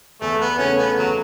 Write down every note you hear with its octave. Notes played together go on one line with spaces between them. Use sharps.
E2 A3
B3
C#3 A3 C#4
B3
E2 F#3